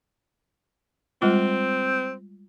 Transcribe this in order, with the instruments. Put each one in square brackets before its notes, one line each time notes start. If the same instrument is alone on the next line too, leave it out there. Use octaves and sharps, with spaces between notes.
[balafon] G3 G#3 F4 [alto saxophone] C4